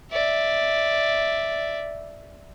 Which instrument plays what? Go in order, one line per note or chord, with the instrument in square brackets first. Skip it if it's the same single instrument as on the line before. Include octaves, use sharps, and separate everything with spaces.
[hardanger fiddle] D5 E5